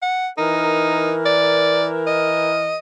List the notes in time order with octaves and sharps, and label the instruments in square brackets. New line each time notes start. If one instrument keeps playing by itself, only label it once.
[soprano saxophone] F#5
[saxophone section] E3 A#4 [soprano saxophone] D#4
[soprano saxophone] D5
D#5